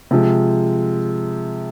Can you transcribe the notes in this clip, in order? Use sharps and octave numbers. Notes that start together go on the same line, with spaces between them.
C3 F3 G#3